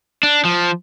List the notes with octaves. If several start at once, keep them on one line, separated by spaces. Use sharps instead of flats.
D4
F3